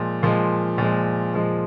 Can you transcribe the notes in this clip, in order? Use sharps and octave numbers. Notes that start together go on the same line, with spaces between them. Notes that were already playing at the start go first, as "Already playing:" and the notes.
Already playing: A#2 F3 G#3
A#2 F3 G#3
A#2 F3 G#3
A#2 F3 G#3